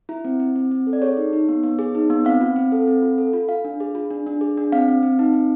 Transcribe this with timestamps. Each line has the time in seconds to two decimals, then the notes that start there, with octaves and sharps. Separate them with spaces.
0.09 E4
0.25 C4
0.40 C4
0.56 C4
0.71 C4
0.87 A4
0.93 D5
1.02 G#4 C#5
1.17 D#4
1.33 D#4
1.49 B3
1.63 B3
1.79 G#4
1.95 D#4
2.10 B3
2.25 C4 F5
2.41 F4
2.56 C4
2.72 A4
2.88 C4
3.02 F4
3.18 A4
3.33 F4
3.49 F4 F5
3.64 D4
3.80 G#4
3.95 F4
4.10 D4
4.27 D4
4.41 G#4
4.57 D4
4.72 C4 F5
4.88 C4
5.03 C4
5.19 D#4
5.33 C4